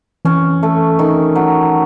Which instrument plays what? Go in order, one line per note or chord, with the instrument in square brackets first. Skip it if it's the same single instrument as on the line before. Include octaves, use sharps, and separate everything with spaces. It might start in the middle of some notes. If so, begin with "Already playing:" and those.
[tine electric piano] E3 [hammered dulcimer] C#4
[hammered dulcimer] A3
D#3
F#3